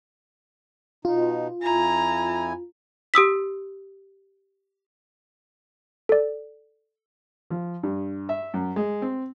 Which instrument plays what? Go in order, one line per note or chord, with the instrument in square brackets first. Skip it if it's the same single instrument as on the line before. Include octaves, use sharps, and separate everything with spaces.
[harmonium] B2 D#4 [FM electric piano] F4
[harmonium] F2 E4 G#5 [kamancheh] A#5
[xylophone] G4 D#6 E6 B6
[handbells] A4 D5
[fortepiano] F3
G2
E5
F#2
G#3
C4